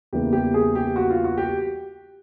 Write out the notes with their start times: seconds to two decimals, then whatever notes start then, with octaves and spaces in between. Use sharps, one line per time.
0.13 E2 C#3 E3 G3 A#3 G4
0.33 G4
0.54 G#4
0.75 G4
0.96 F#4
1.10 F4
1.24 F#4
1.38 G4